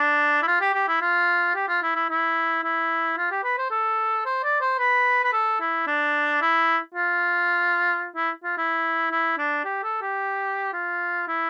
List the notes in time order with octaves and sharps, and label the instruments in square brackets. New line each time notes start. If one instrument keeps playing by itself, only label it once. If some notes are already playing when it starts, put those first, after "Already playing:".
Already playing: [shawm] D4
E4
F4
G4
G4
E4
F4
G4
F4
E4
E4
E4
E4
F4
G4
B4
C5
A4
C5
D5
C5
B4
B4
A4
E4
D4
E4
F4
E4
F4
E4
E4
D4
G4
A4
G4
F4
E4